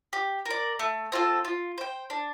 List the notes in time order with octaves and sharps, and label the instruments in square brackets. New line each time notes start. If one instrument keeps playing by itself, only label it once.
[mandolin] G4
A#4 D5
A3
C4 F4 A4
F4
C5 G5
D4